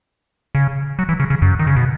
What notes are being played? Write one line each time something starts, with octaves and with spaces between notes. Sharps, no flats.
C#3
F#3
E3
C#3
C#3
F#2
D#3
C#3
B2